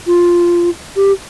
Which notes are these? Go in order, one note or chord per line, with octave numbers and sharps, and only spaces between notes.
F4
G4